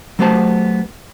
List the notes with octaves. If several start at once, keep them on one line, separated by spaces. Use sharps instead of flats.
F#3 A3 B3 G4 C5 A5